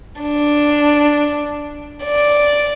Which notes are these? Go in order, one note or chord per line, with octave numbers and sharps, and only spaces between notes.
D4
D5